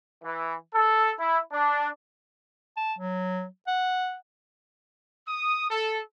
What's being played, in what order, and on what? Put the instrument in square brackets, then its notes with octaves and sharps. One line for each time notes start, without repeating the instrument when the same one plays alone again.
[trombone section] E3
A4
E4
D4
[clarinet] A5
F#3
F#5
[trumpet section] D#6
A4